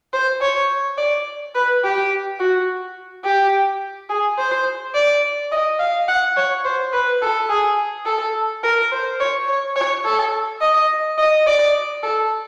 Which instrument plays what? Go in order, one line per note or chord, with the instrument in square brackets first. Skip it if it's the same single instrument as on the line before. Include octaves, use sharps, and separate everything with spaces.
[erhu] C5
C#5
D5
B4
G4
F#4
G4
G#4
C5
D5
D#5
F5
F#5
C#5
C5
B4
A4
G#4
A4
A#4
C5
C#5
C#5
C#5
A4
D#5
D#5
D5
A4